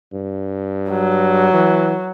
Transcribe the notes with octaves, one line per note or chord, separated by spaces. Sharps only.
G2
F#3
E3